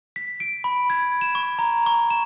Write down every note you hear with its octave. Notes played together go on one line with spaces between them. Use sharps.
B6
D7
B5
G#6
E7
C#6
A#5
C#6
E7